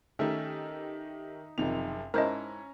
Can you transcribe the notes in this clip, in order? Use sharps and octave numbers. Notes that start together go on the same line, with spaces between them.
D#3 A3 C#4 D#4 G4 E5
F#1 C3 D#3 F3 D#4 F7
G#2 C#4 E4 A#4 C5 D#5 A5 A#5